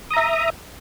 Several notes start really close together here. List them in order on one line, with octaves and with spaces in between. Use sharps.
D#6 A#5 E5